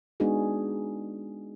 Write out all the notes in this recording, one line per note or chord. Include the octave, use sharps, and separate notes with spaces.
G#3 B3 D4 D#4 F#4 G#4